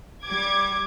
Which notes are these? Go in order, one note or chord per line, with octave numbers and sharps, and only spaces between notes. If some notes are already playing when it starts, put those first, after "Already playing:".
G3 D6 G#6